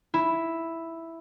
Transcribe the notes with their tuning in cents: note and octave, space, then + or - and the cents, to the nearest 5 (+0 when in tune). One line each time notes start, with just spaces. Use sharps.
E4 +0